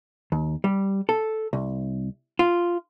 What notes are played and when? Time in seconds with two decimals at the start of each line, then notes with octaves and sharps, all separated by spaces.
0.32 D#2
0.64 G3
1.09 A4
1.53 C2
2.39 F4